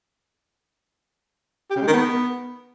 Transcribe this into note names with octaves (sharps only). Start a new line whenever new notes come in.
G4
C#3
G#3
D#3
B3